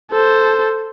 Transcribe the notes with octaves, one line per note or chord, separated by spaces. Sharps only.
A4 C5